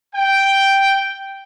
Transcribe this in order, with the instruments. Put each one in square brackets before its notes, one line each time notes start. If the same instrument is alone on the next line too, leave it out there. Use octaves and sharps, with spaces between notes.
[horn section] G5